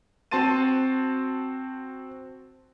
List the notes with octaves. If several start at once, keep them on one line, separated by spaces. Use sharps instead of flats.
C4 F#4 A5 C6 A6 D#7